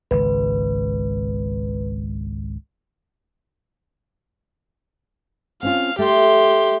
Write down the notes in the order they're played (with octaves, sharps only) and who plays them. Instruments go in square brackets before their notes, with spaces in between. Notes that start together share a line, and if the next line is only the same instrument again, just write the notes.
[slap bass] G#1 C#2 [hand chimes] B4
[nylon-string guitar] C4 C#4 F4 [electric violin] F5
[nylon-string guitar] A3 [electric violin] G4 C6